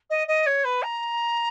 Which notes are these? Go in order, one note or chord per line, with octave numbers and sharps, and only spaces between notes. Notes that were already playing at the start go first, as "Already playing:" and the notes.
D#5
D#5
C#5
B4
A#5